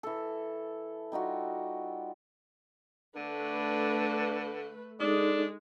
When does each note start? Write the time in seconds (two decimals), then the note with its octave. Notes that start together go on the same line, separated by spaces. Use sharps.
0.03 E3 A4
1.12 G3 D#4 F4 F#4
3.16 D3 A3 D4 B4
5.00 G#3 D4 D#4 A4 D5